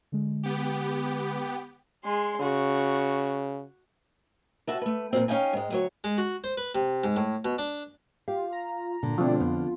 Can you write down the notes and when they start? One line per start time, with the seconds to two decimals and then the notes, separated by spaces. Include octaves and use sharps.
0.12 D3 G#3
0.43 B3 G4
2.04 G#3 C6
2.42 C#3 F#4
4.67 C3 F#4 E5 A5
4.82 A3 B4
5.13 A#2 C#3 F3 C4
5.28 C#4 D#4 F5 G5 G#5
5.53 G#2 G#3
5.70 D2 F#3 C#5
6.04 G#3
6.18 F#4
6.44 C5
6.57 B4
6.75 C3
7.04 G#2
7.16 A2
7.45 B2
7.58 D4
8.28 F4 G4 F5
8.52 A#5
9.03 A#2 D3
9.18 B2 F3 A3 C4 D4 F4
9.40 F2 B3